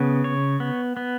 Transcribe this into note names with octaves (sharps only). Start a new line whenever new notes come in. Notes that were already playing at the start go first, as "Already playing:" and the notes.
Already playing: C#3 B3
C#5
B3
B3